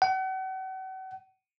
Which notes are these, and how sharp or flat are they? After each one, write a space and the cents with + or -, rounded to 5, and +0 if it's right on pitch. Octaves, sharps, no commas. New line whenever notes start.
F#5 +40